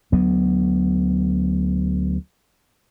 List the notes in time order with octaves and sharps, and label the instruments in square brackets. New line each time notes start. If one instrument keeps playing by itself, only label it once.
[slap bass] D2 F#3 B3